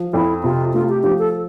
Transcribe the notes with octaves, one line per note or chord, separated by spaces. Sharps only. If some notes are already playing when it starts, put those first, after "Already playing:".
Already playing: F3
F2 E4
C3 F4
A3 F4
G4
F3 G4
A4